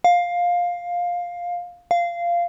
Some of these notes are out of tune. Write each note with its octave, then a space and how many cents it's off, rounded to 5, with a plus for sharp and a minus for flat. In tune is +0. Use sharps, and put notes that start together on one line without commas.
F5 +10
F5 -15